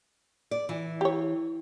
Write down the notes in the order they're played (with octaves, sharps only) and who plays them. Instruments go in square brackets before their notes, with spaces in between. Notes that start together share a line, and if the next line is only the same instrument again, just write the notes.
[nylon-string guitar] D5
E3
[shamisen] G4 C#5